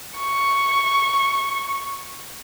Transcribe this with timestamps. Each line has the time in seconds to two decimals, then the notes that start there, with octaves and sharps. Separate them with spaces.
0.19 C#6